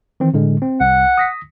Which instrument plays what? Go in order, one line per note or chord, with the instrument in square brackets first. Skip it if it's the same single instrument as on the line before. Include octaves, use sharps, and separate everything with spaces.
[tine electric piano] D#3 E3 C4
A2 D3 G#3
C4
[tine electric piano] C2 [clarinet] F#5
[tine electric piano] D#6 A#6 B6